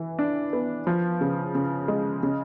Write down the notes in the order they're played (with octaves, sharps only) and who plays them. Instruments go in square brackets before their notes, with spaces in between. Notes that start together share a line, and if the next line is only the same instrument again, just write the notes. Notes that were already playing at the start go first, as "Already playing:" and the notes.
Already playing: [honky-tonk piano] E3
D4
B3
F3
C#3
C#3
G#3
C#3